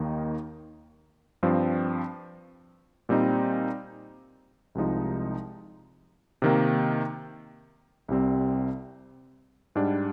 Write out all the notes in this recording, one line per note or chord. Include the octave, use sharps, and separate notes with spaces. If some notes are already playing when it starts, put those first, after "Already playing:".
Already playing: D#2 D#3 A#3 D#4
G2 F3 C4
A#2 G3 C4 D#4
C2 C3 F3 G#3 D#4
C3 D#3 A#3
C2 C3 G3 C4
G#2 G3 D4